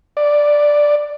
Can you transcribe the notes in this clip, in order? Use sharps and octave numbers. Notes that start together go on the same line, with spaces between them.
D5